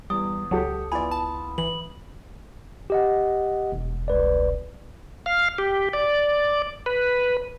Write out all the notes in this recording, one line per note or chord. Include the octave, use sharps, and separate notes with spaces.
E2 G3 D#6
C#2 F#3 G4 A4 F#5
B3 E4 F4 D5 G#5 B5
A5
E3 F#7
G4 D#5 F#5
E1
C2 B4 D5
F5
G4
D5
B4